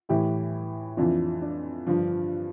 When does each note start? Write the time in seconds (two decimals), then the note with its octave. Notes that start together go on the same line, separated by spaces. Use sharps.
0.09 A2 E3 E4 G4
0.97 F2 E3 D4 F4
1.42 D4
1.87 G2 D3 F3